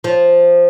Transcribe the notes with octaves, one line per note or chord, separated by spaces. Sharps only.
F3